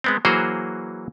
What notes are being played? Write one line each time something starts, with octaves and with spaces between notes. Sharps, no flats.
G#3 B3 C4
E3 F#3 A#3 F#4 G#4 C5